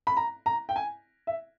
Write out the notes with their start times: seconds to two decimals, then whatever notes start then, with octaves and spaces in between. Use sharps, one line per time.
0.07 B5
0.17 A#5
0.46 A#5
0.69 G5
0.76 G#5
1.27 E5